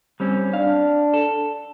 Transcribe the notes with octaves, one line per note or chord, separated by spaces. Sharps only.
G3 C4 C#4
D4 F5
A4